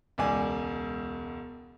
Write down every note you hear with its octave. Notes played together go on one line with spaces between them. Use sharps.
E1 C#2 D5 G#5